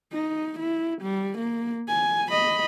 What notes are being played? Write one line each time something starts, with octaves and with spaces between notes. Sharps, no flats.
D#4
E4
G3
A#3
G#5
D#5 B5